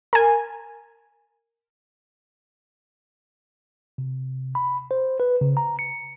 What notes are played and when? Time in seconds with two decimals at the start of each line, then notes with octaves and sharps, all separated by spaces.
0.13 A#4 G#5
3.98 C3
4.55 B5
4.91 C5
5.20 B4
5.41 C#3
5.57 A#5
5.79 C#7